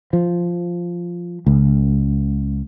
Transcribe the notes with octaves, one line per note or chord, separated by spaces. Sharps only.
F3
C#2